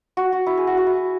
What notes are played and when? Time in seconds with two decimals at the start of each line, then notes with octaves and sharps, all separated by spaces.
0.17 F#4
0.32 F#4
0.46 E4
0.57 G#4
0.67 F#4
0.77 F#4
0.87 E4
0.97 F#4